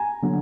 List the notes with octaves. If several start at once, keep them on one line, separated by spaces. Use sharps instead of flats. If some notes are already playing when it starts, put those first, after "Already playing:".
Already playing: G#5 A#5
D3 F#3